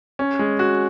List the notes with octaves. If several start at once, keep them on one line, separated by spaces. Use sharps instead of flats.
C#4
G#3
F#4